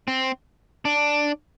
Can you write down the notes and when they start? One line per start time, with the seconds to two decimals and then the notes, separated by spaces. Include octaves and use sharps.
0.08 C4
0.85 D4